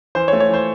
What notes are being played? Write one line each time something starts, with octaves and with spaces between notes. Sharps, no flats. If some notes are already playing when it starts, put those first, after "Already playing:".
E3 C5
C#5
A3
C#5
E3 C5